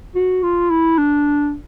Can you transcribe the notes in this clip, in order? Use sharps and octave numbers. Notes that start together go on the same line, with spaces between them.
F#4
F4
E4
D4